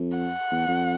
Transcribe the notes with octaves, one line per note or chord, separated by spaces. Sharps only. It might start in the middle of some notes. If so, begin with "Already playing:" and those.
Already playing: F2
F#5
E2
F2